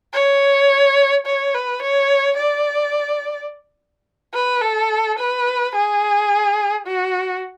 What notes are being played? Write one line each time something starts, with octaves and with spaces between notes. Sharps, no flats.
C#5
C#5
B4
C#5
D5
B4
A4
B4
G#4
F#4